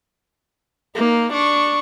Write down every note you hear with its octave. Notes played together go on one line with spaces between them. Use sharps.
A#3 D#4
D4 C#6